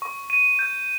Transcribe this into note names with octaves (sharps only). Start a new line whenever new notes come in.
C#6
D#7
G6